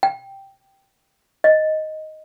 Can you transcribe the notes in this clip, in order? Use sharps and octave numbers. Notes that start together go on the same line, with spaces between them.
G5
D#5